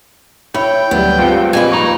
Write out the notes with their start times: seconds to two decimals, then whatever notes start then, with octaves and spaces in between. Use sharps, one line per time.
0.54 E4 C#5 G5 B5
0.91 D2 F#3 G3 B3
1.18 G2 G#3 C4 F4 C#7
1.53 F2 A#3 B4 G#5
1.72 D#4 A#5 B5 C#6